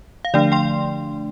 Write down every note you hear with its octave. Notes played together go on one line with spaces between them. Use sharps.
F5
D3 F3 A3 D4 D5 G5
G5 C6